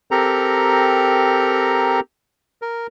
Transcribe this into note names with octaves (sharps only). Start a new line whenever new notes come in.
C4 G4 A4 A#4 A#5
A#4